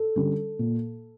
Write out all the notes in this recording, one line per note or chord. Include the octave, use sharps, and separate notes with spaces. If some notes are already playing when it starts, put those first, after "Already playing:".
Already playing: A4
D3 G3 C#4
A#2